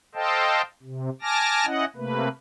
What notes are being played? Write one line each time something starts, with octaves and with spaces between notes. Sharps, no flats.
A4 C5 D#5 F5 G5 A5
C3
G#5 A5 D6 F6 A#6
C#4 E4 D#5 F#5
C3 A3 A#3 B4